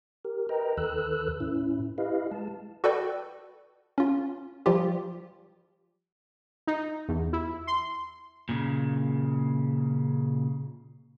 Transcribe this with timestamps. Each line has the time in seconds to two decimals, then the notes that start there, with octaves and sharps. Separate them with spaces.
0.25 G4 A#4
0.49 A#4 B4 D#5 G5 A#5
0.77 D#2 D#3 A4 B4 E6 F#6
1.40 A2 C#4 E4
1.98 E4 G4 B4 D#5 F5
2.31 G#3 A5
2.84 F#4 A4 B4 D5 G5
3.98 C#4 F4
4.66 F3 G3 F4 G4
6.67 D#4
7.08 E2
7.33 E4
7.67 C6
8.49 A#2 C#3